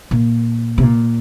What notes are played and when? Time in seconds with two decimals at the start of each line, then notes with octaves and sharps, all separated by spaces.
0.11 A#2
0.78 C3
0.83 A#2